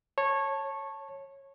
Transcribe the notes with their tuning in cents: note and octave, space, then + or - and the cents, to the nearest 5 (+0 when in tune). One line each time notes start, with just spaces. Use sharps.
C#5 -15 A5 +0